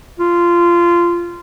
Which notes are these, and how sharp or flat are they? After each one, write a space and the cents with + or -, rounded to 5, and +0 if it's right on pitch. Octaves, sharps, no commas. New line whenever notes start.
F4 -15